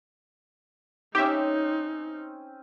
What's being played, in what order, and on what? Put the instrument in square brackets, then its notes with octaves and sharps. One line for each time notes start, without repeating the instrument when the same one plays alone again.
[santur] C4 C#4 [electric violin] D#4 [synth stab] G4 E5